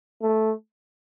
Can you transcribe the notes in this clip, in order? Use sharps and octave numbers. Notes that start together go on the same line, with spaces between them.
A3